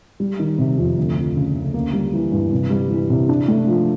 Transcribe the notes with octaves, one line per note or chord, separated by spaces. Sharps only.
G3
D#3
C3
F2
D2
F3
C#3
D2
A#3
G3
E3
G2
C3
G3
E3
C3
D4
A3
F3